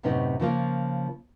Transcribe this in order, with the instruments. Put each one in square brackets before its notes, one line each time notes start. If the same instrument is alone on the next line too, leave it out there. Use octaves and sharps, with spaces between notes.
[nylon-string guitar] F#2 A2 C3 B3 C#4 D#4
C#3 F3 A#3 F4